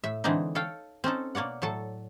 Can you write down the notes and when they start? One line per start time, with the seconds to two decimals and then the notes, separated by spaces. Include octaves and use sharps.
0.04 A2 E5
0.24 D3 E3 G#3 C4 D4 D#4
0.55 A4 C#5 F5 G5
1.04 C4 C#4 D#4 A4
1.35 B2 A#3 C#5 D5 F#5
1.62 A2 F#3 A4 A5